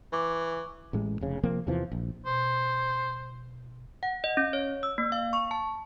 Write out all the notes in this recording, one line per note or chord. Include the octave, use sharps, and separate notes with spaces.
E3 C#6 D6
A1 A2 G#3
F1 C#3
C3 F3 A#3 C4
E2 C3 E3 F3
A#1
B2 C5
F#5
D#5
C#4
C#5
E6
A#3
F5
C#6
A5